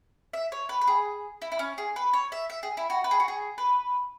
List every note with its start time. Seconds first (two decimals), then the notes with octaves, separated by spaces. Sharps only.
0.33 E5
0.52 C#5
0.69 B4
0.81 B4
0.87 G#4
1.42 E4
1.52 E4
1.59 C#4
1.78 G#4
1.96 B4
2.13 C#5
2.32 E5
2.50 E5
2.63 G#4
2.77 E4
2.90 F#4
3.04 B4
3.11 G#4
3.20 F#4
3.28 G#4
3.58 B4